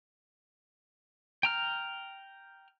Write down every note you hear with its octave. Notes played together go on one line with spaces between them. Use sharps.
G5 A#5 F6